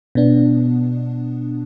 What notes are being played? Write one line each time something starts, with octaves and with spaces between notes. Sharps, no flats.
B2 B3 D4